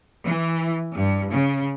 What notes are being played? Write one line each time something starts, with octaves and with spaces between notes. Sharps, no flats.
E3
G2
C#3